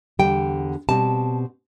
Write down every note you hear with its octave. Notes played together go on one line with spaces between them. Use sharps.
E2 D3 G3 G5
B2 G3 C4 A5